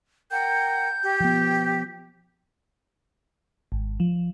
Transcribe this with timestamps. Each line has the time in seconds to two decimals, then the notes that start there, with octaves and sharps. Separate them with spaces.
0.31 A#4 F#5 G5 G6
1.03 G4 G5
1.20 F3 B3
3.72 G#1
4.00 F3